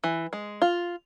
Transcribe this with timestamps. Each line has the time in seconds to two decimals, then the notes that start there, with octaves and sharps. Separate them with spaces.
0.04 E3
0.33 G#3
0.62 F4